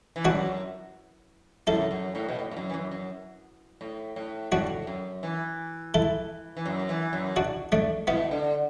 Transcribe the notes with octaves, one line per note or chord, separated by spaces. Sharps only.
E3
F#2 D4 F#4
F#2 E4 A4
F#2
A2
B2
A2
A2
F#2
E3
F#2
F#2
A2
A2
A2 D4 F#4
F#2
E3
E4 A4
E3
F#2
E3
F#2
D4 F#4
A3 D4
B2 B3 E4
D3